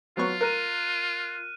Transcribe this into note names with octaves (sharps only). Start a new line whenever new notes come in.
F#3 B3 F4 C#6
A#4 F6 F#6 D#7